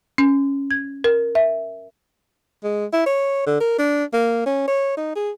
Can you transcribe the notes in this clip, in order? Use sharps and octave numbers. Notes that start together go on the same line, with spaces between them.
C#4
G#6
A#4
E5
G#3
E4
C#5
D3
A#4
D4
A#3
C#4
C#5
D#4
G#4